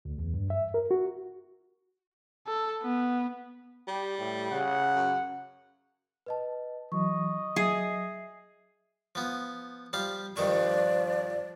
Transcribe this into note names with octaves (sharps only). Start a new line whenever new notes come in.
D2
E2
G2
E5
A#4
F#4
A4
B3
G3 G4
A2
C#3 F#5
F#2
B4 D#5 A5
E3 F#3 D#5 C#6
F#3 G#4 E5 C7
F3 B3
F3 G3 F5
G2 D#3 F3 D5 C#6